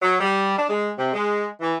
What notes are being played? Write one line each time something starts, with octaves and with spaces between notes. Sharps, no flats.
F#3
G3
D4
G#3
C3
G#3
E3